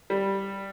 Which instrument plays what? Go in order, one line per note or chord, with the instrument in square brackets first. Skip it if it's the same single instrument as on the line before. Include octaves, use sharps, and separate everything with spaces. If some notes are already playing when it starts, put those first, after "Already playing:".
[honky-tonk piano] G3